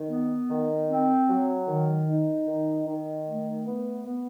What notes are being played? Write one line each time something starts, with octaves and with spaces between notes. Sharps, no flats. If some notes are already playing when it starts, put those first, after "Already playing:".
Already playing: D#3
B3
D#3
C4
F#3
D#3
D#4
D#3
D#3
A3
B3
B3